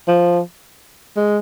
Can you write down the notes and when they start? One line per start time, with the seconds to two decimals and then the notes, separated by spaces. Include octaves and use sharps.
0.08 F3
1.17 G#3